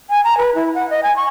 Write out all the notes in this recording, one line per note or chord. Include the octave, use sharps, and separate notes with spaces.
G#5
A#5
B4
E4
F#5
D#5
G#5
C#6